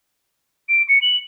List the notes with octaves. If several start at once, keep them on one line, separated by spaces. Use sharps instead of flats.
D7
C#7
F#7